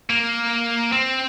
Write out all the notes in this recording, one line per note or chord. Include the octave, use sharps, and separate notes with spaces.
A#3
C4